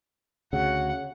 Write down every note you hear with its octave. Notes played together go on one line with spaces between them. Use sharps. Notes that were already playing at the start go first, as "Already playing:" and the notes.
D2 C#3 F#4 F#5